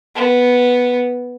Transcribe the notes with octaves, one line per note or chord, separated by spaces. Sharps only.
B3